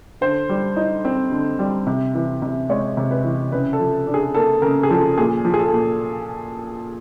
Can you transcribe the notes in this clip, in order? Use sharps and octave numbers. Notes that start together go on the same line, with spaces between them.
D3 C5
G3
D#4
C4
D3
G3
C3
E3
C3
G#3 C#5
C3
B4
E3
C#3 B4
A4
F3
D4
G#4
A#3 A4
C#3 A#4
G#4
F3 A4
A#2 G#4
F3
G#4
A4
A#2